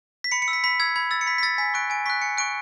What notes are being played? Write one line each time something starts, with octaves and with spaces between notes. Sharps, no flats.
B6
B5 C#7
C#7
E6
B6
B5 B6
E6 G#6
B5 G#6
E6 A6
C#7
B5 B6
B6
E6 A6
G#5 B6
C#6 F#6 D7
G#5 D7
C#6 F#6 B6
G#5 C#7
C#6 F#6 D7